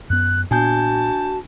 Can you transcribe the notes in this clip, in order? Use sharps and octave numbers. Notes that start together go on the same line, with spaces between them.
F#2 B3 F#6
A#2 B3 D4 F#4 G#5 A5 G6